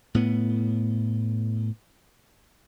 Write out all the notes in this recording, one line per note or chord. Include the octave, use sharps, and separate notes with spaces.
A2 B3